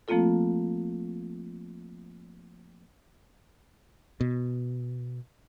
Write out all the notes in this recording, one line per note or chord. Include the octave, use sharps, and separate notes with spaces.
F3 A3 A#3 C4 F4 A4
B2